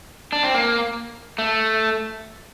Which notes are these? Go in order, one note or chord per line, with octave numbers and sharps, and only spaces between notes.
D4
C4
A#3
A3